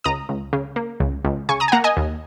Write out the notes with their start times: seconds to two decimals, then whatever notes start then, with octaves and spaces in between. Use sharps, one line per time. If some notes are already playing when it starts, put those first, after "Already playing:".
0.04 C#2 A#5 D#6
0.29 C#2
0.53 C#3
0.76 A#3
1.00 C#2
1.25 C#2
1.49 C#3 G#5 C#6
1.60 A#5 D#6
1.68 G#5
1.72 A#3 F#5 A#5
1.84 D#5 G#5
1.97 D#2